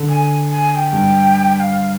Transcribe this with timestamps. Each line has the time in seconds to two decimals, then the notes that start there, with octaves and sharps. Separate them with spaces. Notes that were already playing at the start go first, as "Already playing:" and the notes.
Already playing: D3
0.09 G#5
0.52 G#5
0.72 G#5
0.76 G5
0.93 G2
1.56 G5
1.60 F5